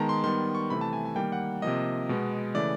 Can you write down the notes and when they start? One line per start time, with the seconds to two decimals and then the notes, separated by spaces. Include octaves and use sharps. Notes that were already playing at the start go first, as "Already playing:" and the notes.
Already playing: D#3 G#3 B3 A5 A#5
0.09 C6
0.24 D#3 G3 B3 C6
0.55 C#6
0.70 C3 E3 A3 B5
0.81 A5
0.93 G#5
1.05 G#5
1.16 D#3 G3 A#3 G5
1.32 F#5
1.62 C3 F3 A#3 D#5
2.09 B2 G#3 B3
2.54 C#3 E3 A3 D5